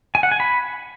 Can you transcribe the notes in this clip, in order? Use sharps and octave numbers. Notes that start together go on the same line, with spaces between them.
G#5
F#5
G#5
B5